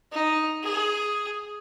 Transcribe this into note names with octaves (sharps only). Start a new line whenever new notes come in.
D#4
G#4